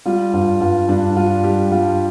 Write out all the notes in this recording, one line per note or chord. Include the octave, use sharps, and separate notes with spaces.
G3 F4
G2 F4
G2 F4
G2 D4
G3 F4
G3 G4
G3 F4